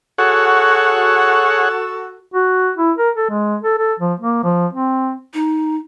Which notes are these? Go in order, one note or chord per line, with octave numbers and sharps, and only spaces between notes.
F#4 G#4 A4 C#5 F#5
F#4
E4
A#4
A4
G#3
A4
A4
F3
A#3
F3
C4
D#4